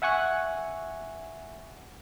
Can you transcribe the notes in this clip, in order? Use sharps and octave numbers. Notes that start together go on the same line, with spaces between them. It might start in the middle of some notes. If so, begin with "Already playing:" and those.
E5 F#5 G#5 C#6 F#6